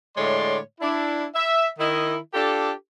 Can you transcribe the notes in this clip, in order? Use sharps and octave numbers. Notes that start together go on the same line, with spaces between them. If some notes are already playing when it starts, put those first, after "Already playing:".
A2 D3 G#3 C#5 D5 C6
D4 E4
E5
D#3 E4 D#5
D4 F4 G4 A4